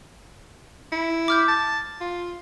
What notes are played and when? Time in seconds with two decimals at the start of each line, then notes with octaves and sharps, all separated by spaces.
0.92 E4
1.28 D6 F6 G6
1.48 A5
2.01 F4